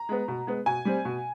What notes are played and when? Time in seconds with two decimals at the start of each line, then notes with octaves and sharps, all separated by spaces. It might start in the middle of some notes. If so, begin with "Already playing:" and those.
Already playing: A#5
0.09 G#3 B3
0.28 B2
0.47 G#3 B3
0.66 B2 G#5
0.85 G3 C4
1.05 B2